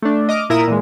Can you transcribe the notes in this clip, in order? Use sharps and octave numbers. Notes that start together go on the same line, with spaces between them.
A3 D4
D#5 D6 F6
A#2 E4 A#4 A#5 D#6 E7
A#2 E3 G#3